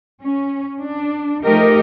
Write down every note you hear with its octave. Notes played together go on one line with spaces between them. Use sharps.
C#4
D4
F3 A3 D#4 G4 A#4 D#5